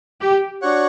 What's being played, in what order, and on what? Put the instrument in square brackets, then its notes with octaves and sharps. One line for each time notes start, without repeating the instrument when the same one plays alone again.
[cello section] G4
[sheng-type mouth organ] D4 F#4 C#5 F#5